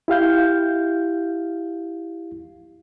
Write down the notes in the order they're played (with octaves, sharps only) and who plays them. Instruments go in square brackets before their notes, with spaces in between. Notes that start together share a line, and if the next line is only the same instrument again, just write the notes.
[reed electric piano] E4 G4 F5 G6